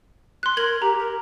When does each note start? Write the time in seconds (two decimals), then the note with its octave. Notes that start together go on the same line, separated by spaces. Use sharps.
0.43 C6 F#6
0.57 A#4 G#6 F#7
0.82 G4 A#5
0.99 A#4